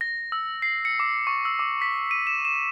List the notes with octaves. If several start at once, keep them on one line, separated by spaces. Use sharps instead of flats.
A#6
E6
C7
C#7
D6
C#6
E6
D6
B6
D#7
E7
E7